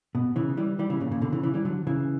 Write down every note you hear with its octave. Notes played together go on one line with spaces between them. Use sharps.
B2
C#3 E3
E3 G3
E3 G3
C#3 E3
A#2 C#3
A#2 C#3
B2 D3
C#3 E3
C#3 E3
E3 G3
D3 F#3
C#3 E3